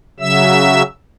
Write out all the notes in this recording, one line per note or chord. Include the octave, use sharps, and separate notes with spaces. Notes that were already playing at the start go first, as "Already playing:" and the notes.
C#3 F#3 E5 E6